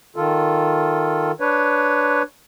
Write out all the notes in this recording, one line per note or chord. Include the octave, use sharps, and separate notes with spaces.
D#3 F4 A4
D4 B4 C#5